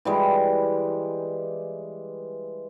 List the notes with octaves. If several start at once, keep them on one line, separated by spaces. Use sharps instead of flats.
E3 G3 G#3